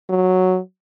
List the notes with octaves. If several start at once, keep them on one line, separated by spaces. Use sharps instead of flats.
F#3